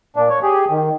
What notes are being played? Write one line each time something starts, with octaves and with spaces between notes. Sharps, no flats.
A#2 D4
C#5
G4 G#4
D#3